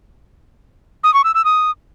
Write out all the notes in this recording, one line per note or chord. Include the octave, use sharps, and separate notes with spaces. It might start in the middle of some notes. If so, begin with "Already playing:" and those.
D#6
C#6
E6
E6
D#6